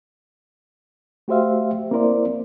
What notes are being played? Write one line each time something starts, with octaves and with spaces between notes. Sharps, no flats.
A3 F#4 G4 C5 E5 F5
A#3 C4 E4 A#4 C5 D5